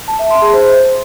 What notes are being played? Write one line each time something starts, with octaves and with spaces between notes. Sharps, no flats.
A5
E5
C6
G#4
C5